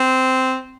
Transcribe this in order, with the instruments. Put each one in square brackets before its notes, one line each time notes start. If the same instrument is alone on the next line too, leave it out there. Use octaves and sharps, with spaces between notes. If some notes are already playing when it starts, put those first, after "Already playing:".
Already playing: [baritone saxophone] C4